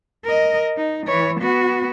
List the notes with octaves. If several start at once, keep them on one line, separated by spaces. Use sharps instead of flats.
A#4 D#5
D#4
E3 C#5
B3 F#4